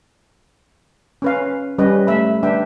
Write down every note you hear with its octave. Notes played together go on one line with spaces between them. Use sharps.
C#4 B4 F5
G3 C#4 B4 D#5
A3 E5 B5
D4 B4 E5 G5